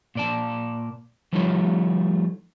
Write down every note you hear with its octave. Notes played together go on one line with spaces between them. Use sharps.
A#2 D5 A5
F3 G3 A3 D#4 F4 C#5